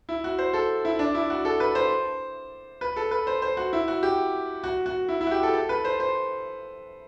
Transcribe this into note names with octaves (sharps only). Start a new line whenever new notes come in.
E4
F#4
C5
A4
E4
D4
E4
F#4
A4
B4
C5
B4
A4
B4
C5
C5
F#4
E4
F#4
G4
F#4
F#4
E4
E4
F#4
G4
A4
A4
B4
C5
C5